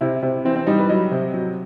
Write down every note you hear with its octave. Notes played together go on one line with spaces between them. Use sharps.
C3 E4
C3
E3 C4
C4
G3 D#4
B4
F#3 D#5
C3
F#3